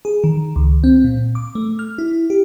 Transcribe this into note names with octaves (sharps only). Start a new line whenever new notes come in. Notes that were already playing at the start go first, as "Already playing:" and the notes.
G#4
D#3
C#2
C4
A#2
D6
A3
F6
E4
G4